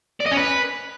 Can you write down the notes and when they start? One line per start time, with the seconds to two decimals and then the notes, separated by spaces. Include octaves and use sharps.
0.20 D5
0.26 D#5
0.31 C#4
0.37 B4